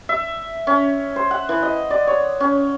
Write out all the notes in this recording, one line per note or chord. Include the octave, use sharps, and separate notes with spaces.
E5
C#4
C5
F#5
E3
D#5
D5
C#5
C#4